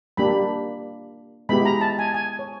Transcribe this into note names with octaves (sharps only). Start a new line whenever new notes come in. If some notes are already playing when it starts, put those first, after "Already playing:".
G3 A#3 D4 G4 B5
G#3 B3 E4 G4 B5
A#5
A5
G#5
G#5
C#5